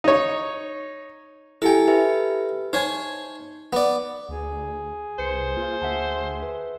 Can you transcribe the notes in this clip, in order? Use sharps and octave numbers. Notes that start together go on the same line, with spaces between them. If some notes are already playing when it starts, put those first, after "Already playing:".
D#4 C#5
E4 G4 A4 G5 G#5
G4 B4 E5
D#4 C5 C#5 G#5
B3 D5
D2 G#4
C2 B4 C5 C#7
A#3 F4
D2 E5 F#5 A5
B4 E5